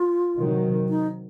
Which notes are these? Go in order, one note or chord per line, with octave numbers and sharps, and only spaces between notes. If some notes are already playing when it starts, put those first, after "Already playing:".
Already playing: F4
C3 D#3 F#3
D#4